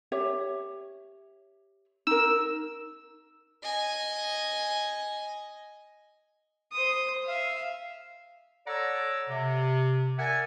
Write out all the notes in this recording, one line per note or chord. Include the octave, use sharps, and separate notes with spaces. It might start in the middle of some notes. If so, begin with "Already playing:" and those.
G4 C#5 E5
D#4 A#4 E6
D#5 G#5
C5 D#6
E5 F5
A4 C#5 D5 F#5 A#5 E6
C3
A#4 D5 E5 F#5 G#5